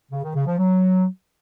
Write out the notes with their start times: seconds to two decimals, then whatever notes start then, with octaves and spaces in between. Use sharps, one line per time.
0.12 C#3
0.23 D#3
0.35 C#3
0.47 F3
0.58 F#3